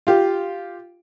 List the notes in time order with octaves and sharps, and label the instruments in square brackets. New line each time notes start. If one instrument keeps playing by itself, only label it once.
[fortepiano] F4 G4